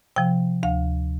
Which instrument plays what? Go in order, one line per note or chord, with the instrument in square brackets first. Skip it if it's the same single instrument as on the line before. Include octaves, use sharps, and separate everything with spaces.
[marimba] C3 F3 G5
D2 F5